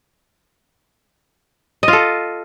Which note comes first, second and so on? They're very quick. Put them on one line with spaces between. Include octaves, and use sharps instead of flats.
D#5 F4 A4